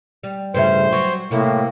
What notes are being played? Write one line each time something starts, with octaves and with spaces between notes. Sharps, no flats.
G3
A1 G2 C#3 B4 C5 E5
F#3 C#6
A2 C3 A#3 E4